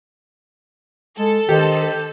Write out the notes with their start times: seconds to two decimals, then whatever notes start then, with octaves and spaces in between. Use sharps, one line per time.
1.19 G#3 A4
1.49 D#3 D4 G4 C5 D#5